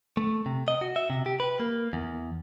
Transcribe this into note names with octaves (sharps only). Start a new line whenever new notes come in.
A3
C3
D#5
F#4
E5
C3
G4
B4
A#3
E2